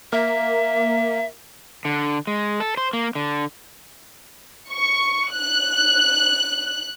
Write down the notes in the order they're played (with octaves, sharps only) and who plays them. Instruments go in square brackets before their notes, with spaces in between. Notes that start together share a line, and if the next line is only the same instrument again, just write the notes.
[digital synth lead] A#3 [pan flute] E5
[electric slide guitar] D3
G#3
A4
C5
A#3
D3
[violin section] C#6
F#6